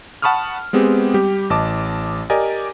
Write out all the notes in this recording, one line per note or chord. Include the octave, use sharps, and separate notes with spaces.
F#5 A5 B5 C#6 D#6 F6
G#3 B3 C4 G4 G#4
G3 G4
A1 D#5 A5 D6
G4 A#4 D5 D#5 G#5